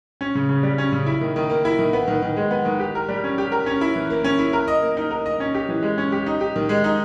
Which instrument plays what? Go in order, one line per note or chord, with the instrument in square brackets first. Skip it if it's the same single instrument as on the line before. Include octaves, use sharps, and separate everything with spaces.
[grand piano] C#4
C#3
C#3
G3
C#4
C#3
E4
D#3
D#3
A#3
E4
D#3
B3
D#3
D#3
G#3
B3
D#3
G4
A#4
G3
C#4
G4
A#4
C#4
E4
E3
A#3
C#4
E4
A#4
D#5
A#3
D#4
A#4
D#5
C#4
G4
E3
G#3
C#4
G4
D#4
G4
D#3
G#3
D#4